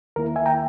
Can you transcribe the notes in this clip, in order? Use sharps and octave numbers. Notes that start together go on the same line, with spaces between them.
D#2 D#3 A#3 E4 A#4
E5 G#5
G5 A#5